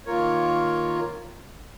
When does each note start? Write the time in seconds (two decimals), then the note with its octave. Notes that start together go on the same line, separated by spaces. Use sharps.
0.06 D#3 A#3 F4 A#4 C#5